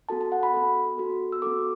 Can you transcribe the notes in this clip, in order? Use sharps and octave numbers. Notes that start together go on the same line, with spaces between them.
B3 F#4 A4 A5
A5
F#5
B5
B3 F#4 A4
B3 F#4 A4
E6
B3 F#4 A4 D6